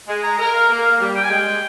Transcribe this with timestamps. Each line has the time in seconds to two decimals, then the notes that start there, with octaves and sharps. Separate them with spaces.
0.08 G#3 G#5
0.23 A#5
0.38 A#4 A#5
0.54 F5
0.68 A#3 F5
0.84 F5
0.99 G3
1.15 G5
1.23 G#5
1.30 G#3 G5